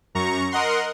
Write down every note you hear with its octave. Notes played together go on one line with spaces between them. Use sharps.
F#2 A#5 C#6
A#4 D#5 F#5 C6